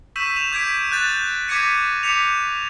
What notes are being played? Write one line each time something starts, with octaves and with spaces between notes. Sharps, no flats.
C#6 E6 G6 B6 D#7 E7
E7 F7
D6 G6 G#6 B6 D7
F#6 G6 A6
D6 G#6 A#6 B6 C#7 D#7
D6 G6 B6 C#7 F7